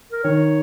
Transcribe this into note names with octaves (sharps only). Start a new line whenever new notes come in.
A#4
D#3 C#5